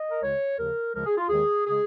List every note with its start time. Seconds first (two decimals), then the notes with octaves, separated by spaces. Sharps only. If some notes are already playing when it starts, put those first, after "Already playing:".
Already playing: D#5
0.10 A#4
0.22 C#2 C#3 G#3 C#5
0.59 D#2 C#3 F3 A#4
0.94 C#2 C#3 F3 G#3 A#4
1.06 G#4
1.18 F4
1.29 D#2 D#3 G#3 G#4
1.66 C#3 G#3 G#4